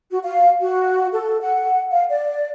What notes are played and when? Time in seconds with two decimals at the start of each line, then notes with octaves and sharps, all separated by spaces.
0.11 F#4
0.24 F5
0.61 F#4
1.13 A4
1.42 F#5
1.92 F5
2.10 D5